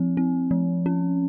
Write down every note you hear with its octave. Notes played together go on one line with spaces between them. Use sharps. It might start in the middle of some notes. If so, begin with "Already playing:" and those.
Already playing: F3 C4
C4
F3
C#4